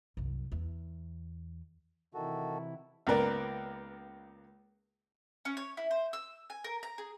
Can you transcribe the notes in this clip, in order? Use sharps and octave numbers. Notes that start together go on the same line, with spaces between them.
C2 F#2
E2
C3 D#3 E3 E4 F#4 A4
C#2 A#3 B3 A#4 D5
C#4
C#5
E4
C5
E6
G#5
A#4
A#5
G#4